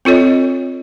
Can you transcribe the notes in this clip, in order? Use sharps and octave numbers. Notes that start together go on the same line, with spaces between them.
C4 F4 A4 C#5 D#5